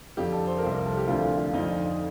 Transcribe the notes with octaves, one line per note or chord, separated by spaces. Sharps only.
F2 D3 F3 G4
A4
C5
A#4
C2 C3 F3 C5
A#4
A4
G4
D2 D3 F3 F4
F4
F4
F2 D3 F3 D#4